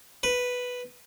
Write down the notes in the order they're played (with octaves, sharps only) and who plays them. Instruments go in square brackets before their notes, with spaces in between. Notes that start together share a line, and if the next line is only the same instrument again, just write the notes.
[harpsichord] B4